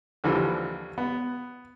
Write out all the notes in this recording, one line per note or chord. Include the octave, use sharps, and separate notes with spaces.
D#2 D3 E3 F3 G3
B3